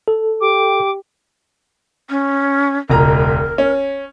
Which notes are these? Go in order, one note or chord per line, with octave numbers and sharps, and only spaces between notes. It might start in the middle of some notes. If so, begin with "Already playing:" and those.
A4
G4 D6
C#4
E1 C#2 A#4 A#5
C#4